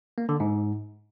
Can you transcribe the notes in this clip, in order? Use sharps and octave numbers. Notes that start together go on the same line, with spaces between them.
A#3
D3
G#2